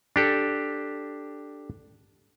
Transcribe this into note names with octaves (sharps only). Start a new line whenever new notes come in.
D4 G4 A4